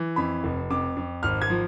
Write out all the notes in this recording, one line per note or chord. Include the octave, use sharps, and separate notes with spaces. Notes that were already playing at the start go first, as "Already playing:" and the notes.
Already playing: E3
F2 B5
F1
F2 D6
F2
G#1 F6
G#6
F3